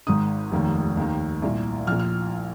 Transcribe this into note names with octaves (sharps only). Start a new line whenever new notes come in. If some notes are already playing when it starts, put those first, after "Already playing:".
G#1 G#2 D#3 D#6
F1 D#2 D#3
D#2 D#3
C2 A#2
A#1 A#2 F6
F6